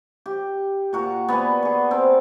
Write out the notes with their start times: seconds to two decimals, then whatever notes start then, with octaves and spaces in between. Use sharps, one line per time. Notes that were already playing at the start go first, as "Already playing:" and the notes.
0.26 G4
0.93 A#2 F#4 A#4
1.28 B3 B4 D5 G#5
1.63 F#4 G#4
1.91 C4 A#4